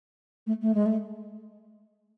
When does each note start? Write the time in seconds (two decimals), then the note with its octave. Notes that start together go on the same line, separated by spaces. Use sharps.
0.47 A3
0.62 A3
0.75 G#3
0.86 A3